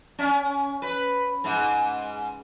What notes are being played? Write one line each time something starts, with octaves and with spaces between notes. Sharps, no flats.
C#4
B4
G#2